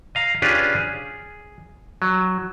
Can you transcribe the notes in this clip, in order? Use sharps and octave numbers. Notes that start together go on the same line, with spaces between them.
D#5 F5 A#5
C#4 D4 F4 G4 G#4 B4
G#4
F#3